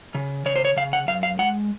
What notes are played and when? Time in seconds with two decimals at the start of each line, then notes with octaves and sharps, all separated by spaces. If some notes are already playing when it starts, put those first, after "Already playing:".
0.15 C#3
0.46 C#3 C#5
0.56 C5
0.65 C#5
0.76 C#3 F5
0.93 F#5
1.08 F#2 F5
1.23 F5
1.39 G#3 F#5